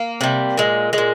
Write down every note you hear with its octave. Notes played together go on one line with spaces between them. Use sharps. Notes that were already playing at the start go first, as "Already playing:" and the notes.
Already playing: A#3
C3 G3
A#2 G#3
G#3
A#2